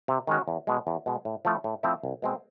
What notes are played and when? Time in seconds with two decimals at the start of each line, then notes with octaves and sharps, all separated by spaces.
0.08 C3
0.27 D#3 G#3 C#4 F#4
0.48 E2
0.67 B2 G#3
0.87 E2
1.06 B2 G#3
1.25 A2
1.45 F3 A3 C4 E4
1.64 A2
1.83 F3 A3 C4 E4
2.03 C2
2.22 B2 G#3 C4